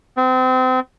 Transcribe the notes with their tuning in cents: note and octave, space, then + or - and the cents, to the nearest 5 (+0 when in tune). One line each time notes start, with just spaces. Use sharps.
C4 -30